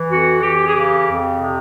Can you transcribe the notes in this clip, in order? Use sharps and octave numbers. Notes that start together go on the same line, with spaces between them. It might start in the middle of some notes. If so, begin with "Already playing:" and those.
Already playing: E3
F2 F#4
E3 G4
G#4
C#3 G4
F2
C3